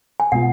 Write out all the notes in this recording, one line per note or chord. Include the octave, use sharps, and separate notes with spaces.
G#5
B2 G#3 B3 F4 F#5